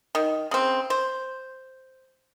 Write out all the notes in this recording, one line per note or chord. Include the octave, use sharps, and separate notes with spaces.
D#3
C#3 C4
C5